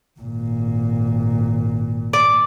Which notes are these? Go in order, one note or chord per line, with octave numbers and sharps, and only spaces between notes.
G#1 A#2
D5